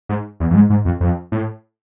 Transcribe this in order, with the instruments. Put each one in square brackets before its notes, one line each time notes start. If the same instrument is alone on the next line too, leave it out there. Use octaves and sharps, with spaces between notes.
[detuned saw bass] G#2
E2
F2
G#2
G#2
F2
F2
A2